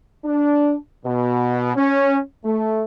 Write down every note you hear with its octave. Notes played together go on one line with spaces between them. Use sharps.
D4
B2
C#4
A3